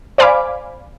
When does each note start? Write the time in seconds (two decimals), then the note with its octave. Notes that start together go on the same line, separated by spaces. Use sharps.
0.18 C5 D5 F5 G#5 B5 D6